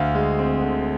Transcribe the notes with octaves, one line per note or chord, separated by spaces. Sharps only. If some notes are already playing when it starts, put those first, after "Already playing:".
Already playing: D2 F5
G#3
C4
D3